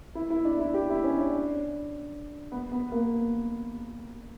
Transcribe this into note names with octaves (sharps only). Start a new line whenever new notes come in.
E4
E4
D4
E4
G4
E4
C#4
D4
B3
B3
A#3